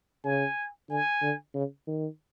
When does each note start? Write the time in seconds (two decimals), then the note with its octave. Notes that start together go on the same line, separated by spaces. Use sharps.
0.24 C#3 G#5
0.89 D3 G#5
1.22 D3
1.54 C#3
1.87 D#3